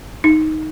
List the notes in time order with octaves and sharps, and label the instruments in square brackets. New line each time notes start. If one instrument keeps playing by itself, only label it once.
[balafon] D#4